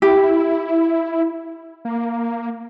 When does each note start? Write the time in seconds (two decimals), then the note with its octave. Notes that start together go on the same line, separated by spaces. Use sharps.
0.02 E4 G4
1.85 A#3